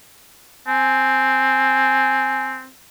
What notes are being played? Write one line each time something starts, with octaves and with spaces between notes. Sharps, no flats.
C4 G#5